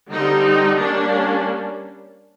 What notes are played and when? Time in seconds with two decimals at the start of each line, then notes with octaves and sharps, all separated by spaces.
0.11 D3 G3 C4 D#4
0.79 G3 A#3 C#4 D4